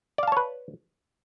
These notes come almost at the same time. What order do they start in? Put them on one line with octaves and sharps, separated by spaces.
D5 F5 A5 C#5 B4